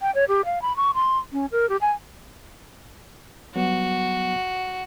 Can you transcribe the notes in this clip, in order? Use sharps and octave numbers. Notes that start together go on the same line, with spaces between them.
G5
C#5
G4
F5
B5
C#6
C6
C#4
A#4
G4
G#5
F#3 G3 B3 F#4